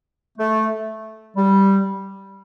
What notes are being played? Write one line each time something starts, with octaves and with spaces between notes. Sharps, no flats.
A3
G3